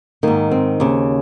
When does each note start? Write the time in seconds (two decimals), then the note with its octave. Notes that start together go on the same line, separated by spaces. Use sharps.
0.23 G#2 D#3 A#3
0.51 C4
0.80 D#2 C#3